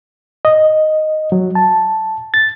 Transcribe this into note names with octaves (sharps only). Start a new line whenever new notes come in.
D#5
F#3
A5
A6